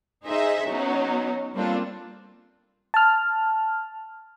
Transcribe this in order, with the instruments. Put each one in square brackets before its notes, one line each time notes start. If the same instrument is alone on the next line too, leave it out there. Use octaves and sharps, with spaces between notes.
[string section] D#4 G#4 C5 D#5 E5
F#3 B3 C#4 D#4
G3 A#3 C4 D4 F4 A4
[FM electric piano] A5 F6